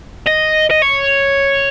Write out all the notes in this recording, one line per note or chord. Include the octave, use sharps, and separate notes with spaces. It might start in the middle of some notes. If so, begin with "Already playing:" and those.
D#5
D#5
C#5